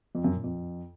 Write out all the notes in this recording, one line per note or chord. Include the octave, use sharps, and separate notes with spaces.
F2
F#2
A#2
F2